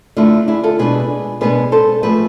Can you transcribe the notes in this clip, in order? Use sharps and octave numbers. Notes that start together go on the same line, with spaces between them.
D3 A3 E4 F4
E4 G#4
F4 A4
B2 G#3 D4 G#4 B4
B2 G#3 B3 D4 G#4 B4
A4 C5
F3 A3 C4 G#4 B4